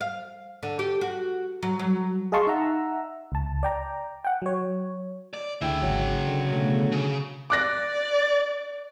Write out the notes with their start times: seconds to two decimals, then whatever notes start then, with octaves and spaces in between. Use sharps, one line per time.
0.01 F5
0.63 D3
0.79 G4
1.01 F#4
1.63 F#3
1.79 F#3
2.32 G#4 D#5 F5 A5 C6 C#6
2.47 D#4 E5 F#5 A#5 E6
3.32 C#2 A5
3.63 D5 G5 A#5
4.24 F#5 G5
4.42 F#3 C#5
5.34 D5
5.61 D2 C#3 E4 G5
5.82 G#1 F#3
6.27 D3
6.50 B2 D3 A3
6.92 C#3
7.50 D5 D6 F#6 A#6